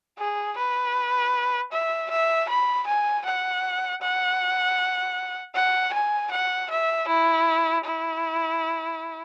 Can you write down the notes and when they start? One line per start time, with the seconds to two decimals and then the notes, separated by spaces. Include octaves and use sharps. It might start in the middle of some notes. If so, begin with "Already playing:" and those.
0.19 G#4
0.57 B4
1.72 E5
2.10 E5
2.49 B5
2.87 G#5
3.25 F#5
4.01 F#5
5.55 F#5
5.93 G#5
6.31 F#5
6.70 E5
7.08 E4
7.85 E4